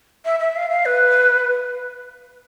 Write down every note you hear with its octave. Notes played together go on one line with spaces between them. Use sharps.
E5
E5
F5
F5
B4